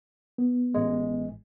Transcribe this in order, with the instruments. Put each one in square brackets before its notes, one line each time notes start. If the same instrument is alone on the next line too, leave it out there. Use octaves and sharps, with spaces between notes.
[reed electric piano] B3
[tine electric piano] A1 G#3